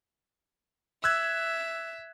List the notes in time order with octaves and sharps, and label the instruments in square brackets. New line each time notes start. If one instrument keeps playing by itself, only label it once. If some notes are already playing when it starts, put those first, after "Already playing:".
[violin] E5 [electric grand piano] E6 F#6 G#6